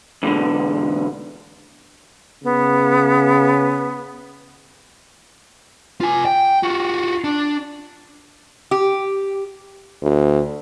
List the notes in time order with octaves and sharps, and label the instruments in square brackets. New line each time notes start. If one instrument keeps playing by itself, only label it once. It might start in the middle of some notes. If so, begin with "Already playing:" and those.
[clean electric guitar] E2 G#2 B2 D3
[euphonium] C#3 [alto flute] B3
[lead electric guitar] F4 G#5
G5
F4 F#4
D4
[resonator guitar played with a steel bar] G4
[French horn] D2